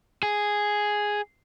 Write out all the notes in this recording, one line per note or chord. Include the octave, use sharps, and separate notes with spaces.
G#4